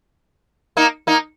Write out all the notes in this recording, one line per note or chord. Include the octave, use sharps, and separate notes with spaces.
A#3 D#4
A#3 D#4